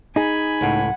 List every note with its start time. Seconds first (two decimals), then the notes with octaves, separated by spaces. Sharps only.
0.16 D#4 G#4 G#5 B5
0.61 C#2 A2 F#5